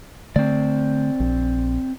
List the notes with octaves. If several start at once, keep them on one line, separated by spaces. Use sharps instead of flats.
D3 A3 C4 D5
A#1